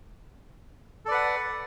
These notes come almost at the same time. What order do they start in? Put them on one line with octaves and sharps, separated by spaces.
A4 D5 B4 F#5